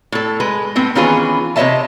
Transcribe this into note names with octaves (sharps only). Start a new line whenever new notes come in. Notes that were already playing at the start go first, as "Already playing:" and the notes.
A2 A4
G#3 B4
A2 B3 C4 G5
D#3 E3 C#4 F4 G#4 B4
C3 B4 C#5 D#5 E5 A5